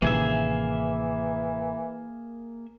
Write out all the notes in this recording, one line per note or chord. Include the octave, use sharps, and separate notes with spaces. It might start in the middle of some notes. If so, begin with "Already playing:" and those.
A1 C3 D#3 E3 A#3 G#4 E5